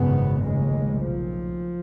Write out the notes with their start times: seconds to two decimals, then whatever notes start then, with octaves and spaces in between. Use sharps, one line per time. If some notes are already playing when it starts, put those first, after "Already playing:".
Already playing: G#1 F#2 C#3 B3
0.42 F1 D#2 C#3 G#3
1.01 B1 A#2 F3